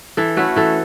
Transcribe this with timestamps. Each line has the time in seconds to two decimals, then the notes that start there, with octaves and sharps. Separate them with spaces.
0.17 E3 A4
0.37 A3 C#4 E4 F#4
0.56 E3 A4